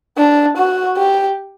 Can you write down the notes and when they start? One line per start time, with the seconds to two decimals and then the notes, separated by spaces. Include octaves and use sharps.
0.18 D4
0.57 F#4
0.97 G4